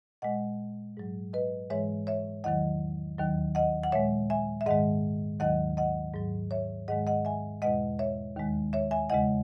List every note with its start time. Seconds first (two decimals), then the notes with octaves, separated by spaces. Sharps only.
0.22 A#2 G#3 D#5 F#5
0.97 G#2 F#3
1.33 B4 D#5
1.70 G#2 E3 G#3 C#5 E5
2.07 C#5 E5
2.44 E2 D#3 F#3 D#5 F#5
3.19 D#2 D#3 F#3
3.55 D#5 F#5
3.83 F#5
3.92 A#2 G#3 C#5 E5
4.30 E5 G#5
4.61 E5
4.66 G#2 D#3 G#3 D#5 F#5
5.40 D#2 D#3 F#3 D#5 F#5
5.77 D#5 F#5
6.14 G#2 F#3
6.51 C#5 E5
6.88 G#2 D#3 G#3 D#5 F#5
7.07 D#5 F#5
7.25 E5 G#5
7.62 E2 B2 G#3 D#5 F#5
7.99 C#5 E5
8.36 D#2 D#3 G#3
8.73 C#5 E5
8.91 E5 G#5
9.10 E2 C#3 G#3 D#5 F#5